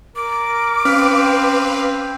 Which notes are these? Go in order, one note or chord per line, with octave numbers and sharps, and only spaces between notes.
A#4 D6
C4 C#4 B4 F5 F6 B6